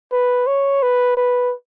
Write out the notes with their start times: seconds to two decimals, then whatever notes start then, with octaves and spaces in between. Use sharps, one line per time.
0.12 B4
0.47 C#5
0.82 B4
1.17 B4